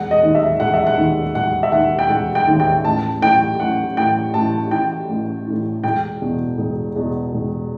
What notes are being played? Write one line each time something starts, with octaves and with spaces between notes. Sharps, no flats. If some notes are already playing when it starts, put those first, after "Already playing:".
Already playing: E1 F#5
D#5
D#2 D#3
E5
E1 F#5
E5
F#5
D#2 D#3
E1 F#5
E5
D#2 D#3 F#5
G5
E1 F#5
G5
D#2 D#3
G5
A1 A5
A2 E3 G5
A1 F#5
A2 E3 G5
A1 A5
A2 E3 G5
A1
A2 E3
E1 G5
E2 B2
E1
E2 B2
E1